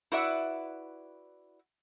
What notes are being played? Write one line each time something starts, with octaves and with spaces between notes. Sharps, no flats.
E4 F#4 B4 D5 E5 F#5